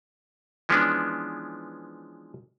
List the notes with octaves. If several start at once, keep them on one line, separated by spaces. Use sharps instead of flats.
E3 F3 G#3 B3 C#4 D4